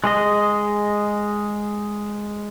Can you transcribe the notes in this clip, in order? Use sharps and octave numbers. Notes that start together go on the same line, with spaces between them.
G#3 G#4 D#5